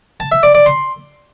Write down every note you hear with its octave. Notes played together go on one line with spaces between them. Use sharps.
A5
E5
D5
D5
C6